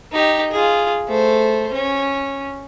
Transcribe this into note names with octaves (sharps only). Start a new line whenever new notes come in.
D#4 G4
F4 G#4
A3 C5
C#4